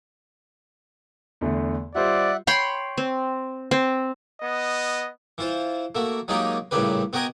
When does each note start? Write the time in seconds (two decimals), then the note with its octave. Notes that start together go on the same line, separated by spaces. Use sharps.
1.41 E2 D3 A3
1.95 G3 F4 C5 D5 E5 F#5
2.47 C#5 G5 B5 C6
2.98 C4
3.71 C4
4.41 B3 D#5
5.38 E3 F4 C5
5.95 A3 A#3 F#4
6.28 F#3 G#3 A#3 D#4 F4 G4
6.71 A1 G2 A#2 C#3 G4 B4
7.13 B3 F#4 G4 A#4 D#5 G#5